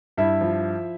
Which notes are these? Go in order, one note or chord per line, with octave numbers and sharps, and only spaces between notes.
G2 E4 E5
F3